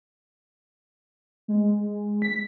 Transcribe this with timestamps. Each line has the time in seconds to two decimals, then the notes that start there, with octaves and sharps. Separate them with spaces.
1.48 G#3
2.22 B6